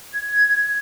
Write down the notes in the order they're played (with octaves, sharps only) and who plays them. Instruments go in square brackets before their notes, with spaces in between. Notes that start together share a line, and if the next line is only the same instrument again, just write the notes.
[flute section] G#6